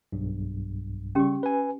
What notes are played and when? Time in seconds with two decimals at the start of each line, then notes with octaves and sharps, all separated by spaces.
0.12 B1 G2
1.15 C#3 G3 C#4 G4 C#6
1.43 B4 G#5